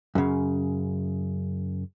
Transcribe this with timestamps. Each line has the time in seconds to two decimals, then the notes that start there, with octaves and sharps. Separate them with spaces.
0.15 F#2 C#3